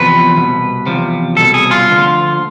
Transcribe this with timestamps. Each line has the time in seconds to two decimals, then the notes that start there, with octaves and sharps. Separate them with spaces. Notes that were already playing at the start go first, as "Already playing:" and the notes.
Already playing: E2 C3 F3 B4
0.36 C2 B2
0.86 E2 C3 F3
1.37 C2 B2 A4
1.54 G#4
1.71 F4
1.88 D2 D3 F3